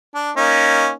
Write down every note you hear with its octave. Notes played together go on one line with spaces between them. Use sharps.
D4
A#3 C#4 D#4